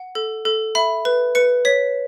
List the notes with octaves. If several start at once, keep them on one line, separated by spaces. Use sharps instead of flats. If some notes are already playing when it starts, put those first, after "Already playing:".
Already playing: F#5
A4
A4
E5 B5
B4
B4 C#7
C#5 B6